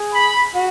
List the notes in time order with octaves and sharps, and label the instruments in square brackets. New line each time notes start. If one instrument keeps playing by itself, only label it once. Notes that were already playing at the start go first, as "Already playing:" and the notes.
Already playing: [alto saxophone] G#4
[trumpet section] B5
[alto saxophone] F#4